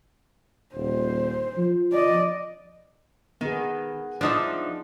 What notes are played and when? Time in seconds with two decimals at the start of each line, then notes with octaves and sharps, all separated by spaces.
0.75 D#1 C5
1.57 F3
1.92 D5 D#5
3.41 D#3 B3 G#4
4.21 F3 D4 D#4 E5